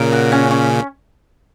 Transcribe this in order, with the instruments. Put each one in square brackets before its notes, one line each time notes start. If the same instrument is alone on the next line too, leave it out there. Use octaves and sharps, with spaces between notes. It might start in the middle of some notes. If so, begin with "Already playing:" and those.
Already playing: [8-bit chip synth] A#2 C#3 [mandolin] A#4
[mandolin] F#4
C#4
C#4